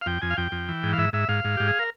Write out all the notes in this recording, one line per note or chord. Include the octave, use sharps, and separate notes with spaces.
F5
F2 G5
F2 G#5
F5
F2 G5
F2
E3
G#2
F5
G#2 E5
G#2 E5
G#2 F5
G#2
G#2 G4
G#4
A#4